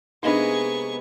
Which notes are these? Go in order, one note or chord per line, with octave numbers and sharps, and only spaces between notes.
C3 G#3 A#3 B3 D4 D#4 G#4 C#6